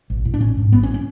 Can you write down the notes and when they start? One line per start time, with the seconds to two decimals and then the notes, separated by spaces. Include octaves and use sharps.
0.10 A1
0.25 A2
0.34 D4
0.41 A1 C#4
0.57 G#2
0.72 A1 B3
0.83 C#4
0.94 C#4